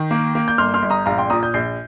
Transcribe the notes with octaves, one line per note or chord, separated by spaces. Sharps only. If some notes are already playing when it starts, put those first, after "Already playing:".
Already playing: D#3
A#3
A#3
G6
G1 C6 F6
C6 F6
G1
A#5 D#6
A#1 F5 A#5
G5 C6
A#2 A#5 D#6
D#6 G6
A#1 G6 C7